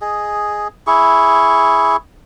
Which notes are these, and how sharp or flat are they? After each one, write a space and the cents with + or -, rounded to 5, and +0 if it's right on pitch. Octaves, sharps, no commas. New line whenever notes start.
G#4 +0 D#5 +0
E4 +0 G#4 +0 C#6 +0